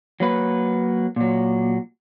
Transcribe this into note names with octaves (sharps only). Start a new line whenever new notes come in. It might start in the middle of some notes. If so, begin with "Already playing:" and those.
F#3 A#3 B4
A#2 F#3